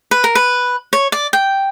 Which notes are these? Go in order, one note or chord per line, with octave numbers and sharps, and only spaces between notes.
B4
A#4
B4
C#5
D5
G5